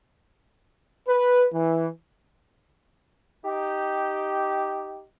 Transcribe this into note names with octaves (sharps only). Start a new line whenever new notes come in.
B4
E3
D#4 G4